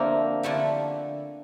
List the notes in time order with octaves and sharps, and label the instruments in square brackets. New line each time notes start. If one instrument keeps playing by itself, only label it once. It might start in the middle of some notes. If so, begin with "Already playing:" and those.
Already playing: [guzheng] D3 F3 A3 E4 G4 [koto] A#3 C4 D4
[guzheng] D3 F3 A3 E4 G4